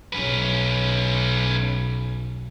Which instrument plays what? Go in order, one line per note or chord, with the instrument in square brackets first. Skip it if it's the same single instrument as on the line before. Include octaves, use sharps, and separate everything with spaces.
[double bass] B1 [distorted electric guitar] C#4 B4